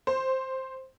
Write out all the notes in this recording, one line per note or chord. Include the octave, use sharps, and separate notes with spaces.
C5